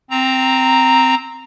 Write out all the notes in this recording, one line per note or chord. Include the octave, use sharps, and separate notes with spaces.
C4 A#5